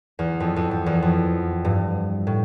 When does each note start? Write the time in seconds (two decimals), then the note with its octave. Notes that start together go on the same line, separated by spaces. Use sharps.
0.19 E2
0.40 F2
0.56 F2
0.71 F2
0.86 E2
1.02 F2
1.65 G2
2.27 A2